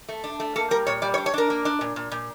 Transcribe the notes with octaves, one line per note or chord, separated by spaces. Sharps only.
A3
D4
A3
A#3 A4
G3 A#4
A#2 C#5
G3 D5
C#5
D4
C#5
D4 A#4
A#3
D4
A#2
A#2
A#2